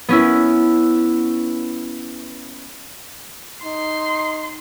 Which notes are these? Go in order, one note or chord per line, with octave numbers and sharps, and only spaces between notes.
B3 C#4 E4
D#4 C6